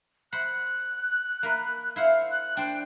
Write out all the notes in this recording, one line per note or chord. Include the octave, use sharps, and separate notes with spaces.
C5 F#5 B5 F#6
A#3 A#4 B4
E4 C5 F5 F#5
F#6
D4 C5 G5